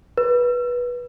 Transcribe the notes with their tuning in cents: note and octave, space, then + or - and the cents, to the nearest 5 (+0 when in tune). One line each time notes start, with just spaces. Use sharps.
B4 -20